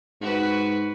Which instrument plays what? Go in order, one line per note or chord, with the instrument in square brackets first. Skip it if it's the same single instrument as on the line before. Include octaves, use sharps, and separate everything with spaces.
[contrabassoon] G#2 [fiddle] F#4 B4